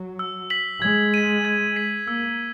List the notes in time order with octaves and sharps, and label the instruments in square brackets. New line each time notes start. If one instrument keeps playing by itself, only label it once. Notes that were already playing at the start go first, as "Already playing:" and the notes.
Already playing: [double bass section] F#3
[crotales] E6
B6 F#7
[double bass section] G#3 [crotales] G#6
[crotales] B6 D#7
G#6
B6 D#7
[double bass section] A#3 [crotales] E6